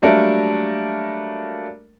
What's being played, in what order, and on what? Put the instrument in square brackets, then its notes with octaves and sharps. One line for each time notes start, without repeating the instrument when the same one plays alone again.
[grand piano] F#3 G3 A3 A#3 D4 A#4